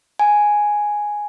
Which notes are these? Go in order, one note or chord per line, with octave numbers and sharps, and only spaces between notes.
G#5